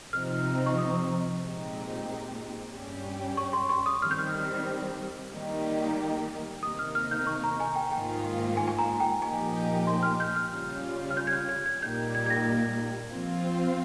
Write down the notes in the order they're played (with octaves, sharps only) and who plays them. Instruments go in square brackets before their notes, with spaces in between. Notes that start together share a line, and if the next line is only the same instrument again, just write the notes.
[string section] C3 F3 C4 D#4 [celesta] F6
[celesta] C#6
D#6
[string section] A#2 G#3 C4 D#4 G4
G2 G3 C#4 G4
[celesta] C#6
C6
C#6
D#6
[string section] D#3 G3 C4 [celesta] F6
[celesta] G6
F6
[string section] D#3 G3 A#3 D#4 G4
[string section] C3 D#3 A#3 D#4 [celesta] D#6
[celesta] F6
F6
G6
C#6
A#5
G#5
G5
[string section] G#2 D#3 A#3 F4 [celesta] G5
[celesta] G#5
G#5
A#5
G5
[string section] A#2 F3 A#3 D#4 G4 [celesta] G#5
[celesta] C6
F6
G6
F6
[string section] C#3 G3 C#4 F4
[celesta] F6
G6
G#6
G6
G#6
G#6
[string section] A#2 G3 A#3 D#4 G4 [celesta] G6
[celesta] G#6
G#6
A#6
[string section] F3 C4 F4